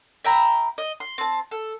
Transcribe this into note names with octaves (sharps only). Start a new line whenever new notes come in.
E5 G5 A#5 B5
D#5
C6
C4 A5
A4